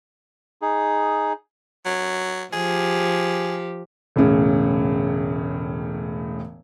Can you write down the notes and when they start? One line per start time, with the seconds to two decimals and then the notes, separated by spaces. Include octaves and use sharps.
0.62 D#4 G#4
1.86 F#3
2.53 F3 G4 G#4
4.16 E1 A2 C#3